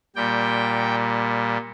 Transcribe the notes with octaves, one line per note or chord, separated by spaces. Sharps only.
A#2 G3 G5